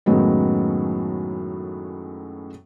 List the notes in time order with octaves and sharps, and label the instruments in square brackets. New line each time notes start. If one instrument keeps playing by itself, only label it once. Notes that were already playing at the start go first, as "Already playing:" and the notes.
[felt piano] F#2 A2 D#3 F#3 G#3 B3